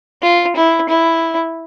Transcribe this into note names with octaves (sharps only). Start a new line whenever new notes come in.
F4
E4
E4